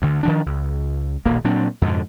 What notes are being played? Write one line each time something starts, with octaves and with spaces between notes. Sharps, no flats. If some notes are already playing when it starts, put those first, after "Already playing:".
D2 D3
D#3 F3 D4
C#2
D#1 A#1 B2 A#3
A#2 F#3 C4 D4
F2 G#2 B2 D3